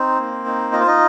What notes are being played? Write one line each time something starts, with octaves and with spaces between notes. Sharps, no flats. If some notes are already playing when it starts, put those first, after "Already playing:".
Already playing: C4 D#4 C5
A#3
D#4
F4 D#5
C5
D#4 D#5